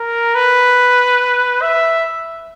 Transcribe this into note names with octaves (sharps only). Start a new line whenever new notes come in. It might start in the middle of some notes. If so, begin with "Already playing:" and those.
Already playing: A#4
B4
E5